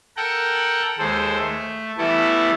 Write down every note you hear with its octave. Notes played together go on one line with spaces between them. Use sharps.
A4 A#4 F#5 G5
D#2 G#3 A4 C5
A3
E3 G3 A3 B3 E4 A4